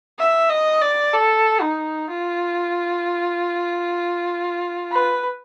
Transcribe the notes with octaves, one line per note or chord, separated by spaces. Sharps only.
E5
D#5
D5
A4
D#4
F4
B4